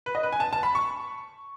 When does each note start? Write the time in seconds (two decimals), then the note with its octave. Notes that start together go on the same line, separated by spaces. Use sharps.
0.06 B4
0.15 D#5
0.23 B4
0.32 G#5
0.40 A5
0.53 A5
0.63 B5
0.75 C#6